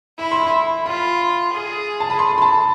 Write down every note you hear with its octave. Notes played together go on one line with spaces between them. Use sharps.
E4 B5
C6
B5
F4 B5
G#4
A5
B5
C6
B5
A5